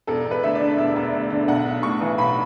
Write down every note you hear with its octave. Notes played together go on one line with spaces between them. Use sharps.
E1 A4
E1
B4
D2 E5
D5
D3
E1 E5
E1
D2
D3
B1 F#5
B1
A2 C#6
E3
B1 B5